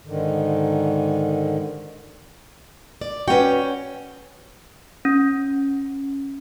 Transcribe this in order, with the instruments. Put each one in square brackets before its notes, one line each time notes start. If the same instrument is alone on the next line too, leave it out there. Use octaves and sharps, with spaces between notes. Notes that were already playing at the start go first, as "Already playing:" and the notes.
[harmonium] G#2 D3 D#3
[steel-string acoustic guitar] D5
[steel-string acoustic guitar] C#4 G5 [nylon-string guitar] F#4 B4
[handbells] C#4